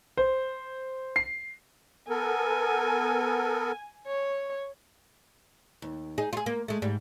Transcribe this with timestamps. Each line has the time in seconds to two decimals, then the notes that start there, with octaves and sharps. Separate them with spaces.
0.17 C5
1.16 C7
2.09 B3 A4 A#4 G#5
4.07 C#5
5.82 D#2
6.18 D#4 G#4
6.33 F4 G#4
6.46 A#3
6.68 G#3 A3
6.82 G#2 G3